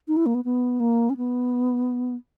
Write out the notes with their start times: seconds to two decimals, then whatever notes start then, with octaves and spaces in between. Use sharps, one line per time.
0.08 D#4
0.17 E4
0.26 A#3
0.35 B3
0.45 B3
0.80 A#3
1.10 C#4
1.17 B3